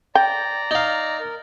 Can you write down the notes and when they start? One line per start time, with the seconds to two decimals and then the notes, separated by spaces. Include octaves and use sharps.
0.15 D5 G5 A#5
0.71 D#4 F5
1.20 A#4